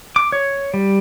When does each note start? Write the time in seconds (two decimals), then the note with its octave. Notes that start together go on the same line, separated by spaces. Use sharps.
0.16 D6
0.32 C#5
0.74 G3